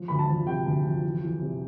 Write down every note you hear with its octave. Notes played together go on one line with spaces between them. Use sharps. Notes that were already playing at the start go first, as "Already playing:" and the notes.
Already playing: F3
D2 B5
A5
F3
C3 G5
D2
F3
E2
E2
C3